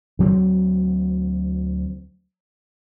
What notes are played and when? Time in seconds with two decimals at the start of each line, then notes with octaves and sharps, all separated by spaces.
0.19 D2 F#3 B3 C4